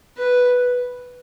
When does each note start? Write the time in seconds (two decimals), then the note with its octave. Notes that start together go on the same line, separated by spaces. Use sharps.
0.18 B4